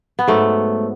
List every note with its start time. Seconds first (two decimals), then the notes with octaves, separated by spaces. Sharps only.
0.19 B3
0.27 G#2 F#3 A3